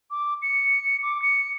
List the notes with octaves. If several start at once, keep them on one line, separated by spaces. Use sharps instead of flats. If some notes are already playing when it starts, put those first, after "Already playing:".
D6
C#7
D6
C#7